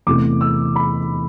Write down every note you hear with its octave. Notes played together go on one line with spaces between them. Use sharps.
E2 C3 E3 A3 D6
E6
B5